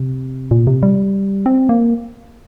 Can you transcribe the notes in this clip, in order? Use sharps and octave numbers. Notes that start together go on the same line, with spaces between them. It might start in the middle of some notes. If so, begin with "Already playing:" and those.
Already playing: C3
A#2
C3
G3
C4
A#3